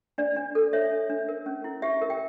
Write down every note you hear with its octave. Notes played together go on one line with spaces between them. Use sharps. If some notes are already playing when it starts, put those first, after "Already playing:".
D4 D5
D4
A4
C#5 E5
D4
D4
A#4
C#4
E4
G4 E5
A#4
G5